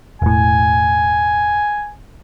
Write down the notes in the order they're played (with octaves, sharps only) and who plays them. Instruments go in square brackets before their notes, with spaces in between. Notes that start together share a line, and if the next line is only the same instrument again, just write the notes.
[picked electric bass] E1 A2 [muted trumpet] G#5